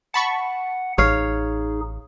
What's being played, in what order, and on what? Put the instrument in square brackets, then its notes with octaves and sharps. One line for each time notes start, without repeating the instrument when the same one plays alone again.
[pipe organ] F#5 [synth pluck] A5 B5 C#6
[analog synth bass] A1 [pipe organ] D#4 G#4 [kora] C#5 F5